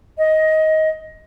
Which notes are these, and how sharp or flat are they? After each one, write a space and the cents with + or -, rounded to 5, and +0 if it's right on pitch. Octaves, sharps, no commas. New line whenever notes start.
D#5 +15